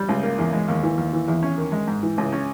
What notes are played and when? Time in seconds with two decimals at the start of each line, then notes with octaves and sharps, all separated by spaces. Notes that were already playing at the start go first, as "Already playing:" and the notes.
Already playing: G3
0.09 C#2
0.23 A#3
0.38 E2
0.53 G#3
0.68 D#2
0.83 E3
0.97 D#2
1.13 E3
1.28 E2
1.43 C#4
1.58 D#3
1.72 G#3
1.87 G#2
2.03 E3
2.18 C#2
2.33 C#4